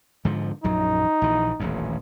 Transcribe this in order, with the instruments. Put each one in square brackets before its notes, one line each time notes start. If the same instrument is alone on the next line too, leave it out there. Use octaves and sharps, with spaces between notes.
[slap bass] G#2 D3 F3
[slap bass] A#1 F#2 F#3 [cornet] D#4
[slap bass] A#1 E3
D#1 A1 F2